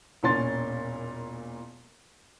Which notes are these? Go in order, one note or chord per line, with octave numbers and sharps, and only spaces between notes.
E1 A#2 C#4 C6 A6